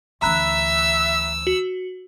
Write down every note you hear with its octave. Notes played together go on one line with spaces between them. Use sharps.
D2 E3 E5 A#5 B5 E6 F#6
F#4